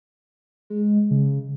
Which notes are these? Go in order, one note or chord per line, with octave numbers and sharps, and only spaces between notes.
G#3
C#3